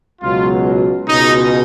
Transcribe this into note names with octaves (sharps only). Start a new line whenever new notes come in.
C#2 B2 F#3 F4
C#2 B2 G#3 D#4